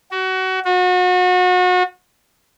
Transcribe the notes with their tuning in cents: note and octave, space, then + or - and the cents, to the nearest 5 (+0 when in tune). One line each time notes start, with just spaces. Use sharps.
F#4 +25
F#4 -35